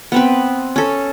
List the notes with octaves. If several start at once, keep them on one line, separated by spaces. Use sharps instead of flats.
B3 C4 B4
C#4 A4